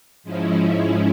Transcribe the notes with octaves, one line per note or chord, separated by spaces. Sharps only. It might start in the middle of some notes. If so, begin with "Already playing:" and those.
G#2 F3 G#3 C#4 E4